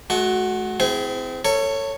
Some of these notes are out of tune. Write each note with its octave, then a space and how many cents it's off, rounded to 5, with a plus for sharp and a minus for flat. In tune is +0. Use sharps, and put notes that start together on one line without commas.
A3 -45 F#4 +0
C4 -30 E4 +0 G#4 +0
A4 +35 C#5 +0